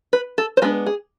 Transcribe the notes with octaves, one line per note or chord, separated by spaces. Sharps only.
B4
A4
C5
G#3 B3 D4 B4
G#4